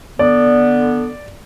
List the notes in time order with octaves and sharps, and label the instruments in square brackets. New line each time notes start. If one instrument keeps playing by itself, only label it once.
[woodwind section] D3 B3 [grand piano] D5